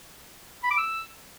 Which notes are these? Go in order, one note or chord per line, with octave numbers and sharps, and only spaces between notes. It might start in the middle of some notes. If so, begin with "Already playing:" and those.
B5
D6
E6